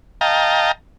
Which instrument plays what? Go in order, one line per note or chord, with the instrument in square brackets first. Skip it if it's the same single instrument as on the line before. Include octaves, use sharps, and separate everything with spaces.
[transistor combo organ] D#5 F5 G5 A5 A#5